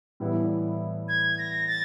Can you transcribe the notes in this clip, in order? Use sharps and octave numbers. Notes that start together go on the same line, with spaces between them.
A2 E3 G3 B3 E4
G#6
A#6
A6